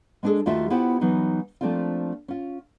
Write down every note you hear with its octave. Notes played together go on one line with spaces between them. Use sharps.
G#3 B3 D4 F4 G#4 A4
D#2 A3 F4 F#4 A#4 E5
B3 E4 F4 G4 C5 F#5
E3 F#3 B3 D#4
F3 A3 A#3 C4 D4 F4
C#4 F4